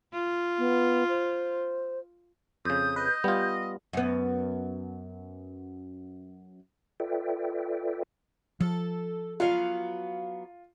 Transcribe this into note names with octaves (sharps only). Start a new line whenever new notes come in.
F4
B3
C5
F2 C#3 D#6 G6
B4 D#5
G3 B3 F4
F#2 B3
F4 A4 B4 D5 E5 G5
F3 A4
F#3 B3 F4 F5